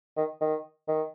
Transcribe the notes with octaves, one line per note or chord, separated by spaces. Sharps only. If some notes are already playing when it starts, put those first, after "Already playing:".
D#3
D#3
D#3